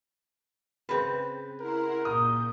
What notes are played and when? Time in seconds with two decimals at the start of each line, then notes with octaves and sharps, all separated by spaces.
0.89 C#3 C4 B4
1.60 E4 A#4 F#5 C6
2.05 A#2 D#6 G6